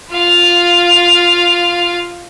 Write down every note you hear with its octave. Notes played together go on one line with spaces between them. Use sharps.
F4 F5